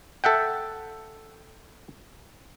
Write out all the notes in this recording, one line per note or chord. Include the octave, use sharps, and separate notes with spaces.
A4 E5 F#5 G5